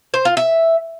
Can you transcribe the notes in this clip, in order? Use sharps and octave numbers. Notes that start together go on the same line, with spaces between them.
C5
F4
E5